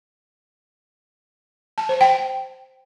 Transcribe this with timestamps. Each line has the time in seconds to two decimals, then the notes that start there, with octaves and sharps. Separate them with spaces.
1.78 A5
1.89 C5
2.01 G5